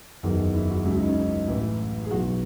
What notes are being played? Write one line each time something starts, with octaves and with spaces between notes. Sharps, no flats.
F#1 E2 D#3 F#3
E4
F#4
C#2 C#3 F#3 E4
D#4
C#4
D#4
A1 A2 E3 E4
G#4
B1 B2 F#3 F#4